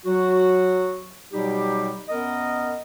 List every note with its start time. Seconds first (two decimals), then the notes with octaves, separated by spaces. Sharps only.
0.06 F#3 F#4
1.33 B2 F#3 G3 D#4 G4
2.09 F#2 B3 A#4 D#5